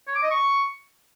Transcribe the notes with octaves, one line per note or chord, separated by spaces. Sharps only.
C#5
D6
D#5
C#6